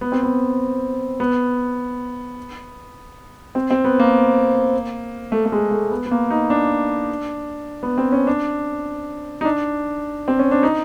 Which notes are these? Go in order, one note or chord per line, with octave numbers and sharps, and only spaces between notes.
B3
C4
B3
B3
C4
C4
B3
A#3
A3
A3
G#3
A3
B3
B3
A#3
D#4
D4
B3
C4
C#4
D4
D#4
D4
C4
C#4
D4
D#4